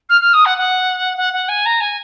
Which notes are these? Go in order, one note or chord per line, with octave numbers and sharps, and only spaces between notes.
F6
F6
D#6
F#5
F#5
F#5
F#5
G#5
A#5
G#5